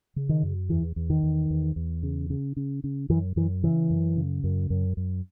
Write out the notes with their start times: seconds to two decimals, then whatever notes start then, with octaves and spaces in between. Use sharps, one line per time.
0.16 C#3
0.29 D#3
0.43 F#2
0.69 E2 E3
0.96 E2
1.10 D#3
1.23 E2
1.50 E2
1.76 E2
2.03 C#3
2.30 C#3
2.56 C#3
2.84 C#3
3.09 F#2 E3
3.36 F#2 E3
3.63 C#3 E3
3.90 F#2
4.17 C#3
4.44 F#2
4.70 F#2
4.97 F#2